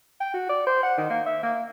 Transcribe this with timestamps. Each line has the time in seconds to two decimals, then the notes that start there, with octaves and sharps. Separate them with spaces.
0.20 G5
0.34 F#4
0.49 D5
0.67 C5
0.83 F#5
0.98 D#3
1.10 A#3
1.26 E5
1.43 A#3